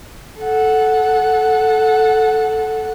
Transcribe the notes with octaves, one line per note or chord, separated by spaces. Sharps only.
A4 F#5